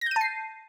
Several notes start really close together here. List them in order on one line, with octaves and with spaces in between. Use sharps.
A#6 G6 D#7 A5 C7